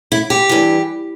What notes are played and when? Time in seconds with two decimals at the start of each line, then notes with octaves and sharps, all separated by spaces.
0.12 E4
0.30 G4
0.49 G2 E3